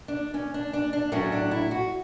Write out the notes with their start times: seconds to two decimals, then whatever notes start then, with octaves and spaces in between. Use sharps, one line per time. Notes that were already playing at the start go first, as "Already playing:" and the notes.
0.08 D4
0.34 C#4
0.54 D4
0.73 D4
0.93 D4
1.12 A2 F#3 A3 C#4
1.32 D4
1.51 E4
1.71 F#4